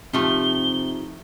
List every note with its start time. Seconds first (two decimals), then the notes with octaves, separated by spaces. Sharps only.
0.13 C3 F3 A3 D#4 F4 G4 G7